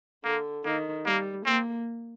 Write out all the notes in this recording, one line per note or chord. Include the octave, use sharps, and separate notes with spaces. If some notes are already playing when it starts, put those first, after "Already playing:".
D3 A#3
D#3 A#3
G3 A#3
A#3 C4